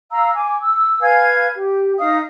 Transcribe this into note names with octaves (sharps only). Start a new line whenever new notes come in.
F5 A#5 E6
G#5 D6
E6
B4 F5 G#5 G#6
G4
D#4 D#5 F5 D#6